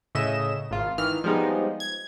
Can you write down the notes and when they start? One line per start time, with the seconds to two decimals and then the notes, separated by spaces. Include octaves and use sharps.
0.15 A2 C#3 D#5 E5 E7
0.71 G#1 F4
0.98 D#3 E3 F6
1.24 F3 G3 G#3 B3 D#4
1.80 G#6